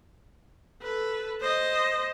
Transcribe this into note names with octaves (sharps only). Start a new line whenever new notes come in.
A4 B4
C5 D#5